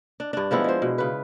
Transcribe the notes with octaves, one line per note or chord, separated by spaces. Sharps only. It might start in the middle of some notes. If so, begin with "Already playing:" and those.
D4
G2 D4
F3 G#3 B3 E4
G#3 C5
B2
C#3 B4